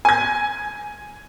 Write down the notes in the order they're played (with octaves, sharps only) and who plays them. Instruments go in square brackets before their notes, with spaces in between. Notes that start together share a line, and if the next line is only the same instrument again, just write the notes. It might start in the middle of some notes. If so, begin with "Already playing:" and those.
[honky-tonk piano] G#5 G#6